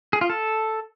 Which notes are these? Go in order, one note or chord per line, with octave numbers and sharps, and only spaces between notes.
G#4
F4
A4